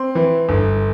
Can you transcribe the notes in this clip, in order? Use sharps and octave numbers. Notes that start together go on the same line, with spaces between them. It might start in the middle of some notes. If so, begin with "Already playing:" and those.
Already playing: C4 C6
E3
G1